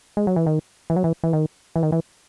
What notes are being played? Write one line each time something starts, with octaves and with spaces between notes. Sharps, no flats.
G#3
F#3
E3
D#3
E3
F#3
E3
E3
D#3
E3
D#3
E3